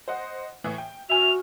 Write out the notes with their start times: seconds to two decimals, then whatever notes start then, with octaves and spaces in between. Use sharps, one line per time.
0.08 C5 D#5 F#5
0.64 A2 E3
0.78 G5
1.10 F#4 E5 G#5 F6 F7